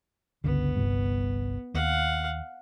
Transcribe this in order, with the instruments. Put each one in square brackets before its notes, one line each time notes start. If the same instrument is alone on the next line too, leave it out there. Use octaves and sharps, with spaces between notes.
[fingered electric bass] G1 C#2 D3 [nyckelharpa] B3
[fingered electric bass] G1 C2 G2
[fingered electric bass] D#2 [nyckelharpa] F5 F#5